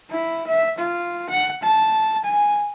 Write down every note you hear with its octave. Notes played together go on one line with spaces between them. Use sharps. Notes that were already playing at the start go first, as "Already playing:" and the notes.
E4
E5
F4
F#5
A5
G#5